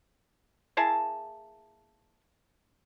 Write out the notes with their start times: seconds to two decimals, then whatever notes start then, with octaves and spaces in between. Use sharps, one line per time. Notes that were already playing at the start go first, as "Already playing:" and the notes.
0.77 A#3 E4 G#4 A5